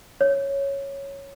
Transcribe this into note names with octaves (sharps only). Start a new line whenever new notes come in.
C#5